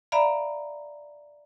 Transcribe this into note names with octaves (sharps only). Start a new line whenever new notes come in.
D5 E5 F5 A#5 B5